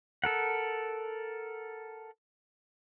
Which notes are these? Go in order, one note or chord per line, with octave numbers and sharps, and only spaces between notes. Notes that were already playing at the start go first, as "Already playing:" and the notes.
A4 A#4 F#5